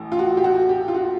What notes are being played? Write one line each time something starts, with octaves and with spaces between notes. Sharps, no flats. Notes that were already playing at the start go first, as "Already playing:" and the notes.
Already playing: A1 A2
F4
F#4
G4
F#4
G4
F4
F#4